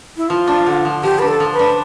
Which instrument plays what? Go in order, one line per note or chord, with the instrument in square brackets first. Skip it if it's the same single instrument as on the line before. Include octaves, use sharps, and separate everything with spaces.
[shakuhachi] E4
[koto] F3 [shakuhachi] F4
[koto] D4
D3
F3
[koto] F3 [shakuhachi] G4
[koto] D4 [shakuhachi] B4
[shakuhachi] A4
[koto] F3
[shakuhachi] B4
[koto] D4